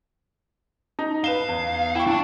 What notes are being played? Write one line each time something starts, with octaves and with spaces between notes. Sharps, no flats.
D#4 A#5
B4 F5 E7 G7
E2
E4 G5 C#6
D4 A5